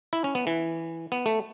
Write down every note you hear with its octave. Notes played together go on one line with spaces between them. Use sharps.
E4
C#4
B3
E3
B3
A3